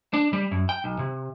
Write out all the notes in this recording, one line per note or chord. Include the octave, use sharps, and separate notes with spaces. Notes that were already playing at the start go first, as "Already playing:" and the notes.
D4
G3
F#2
G5
B1
C3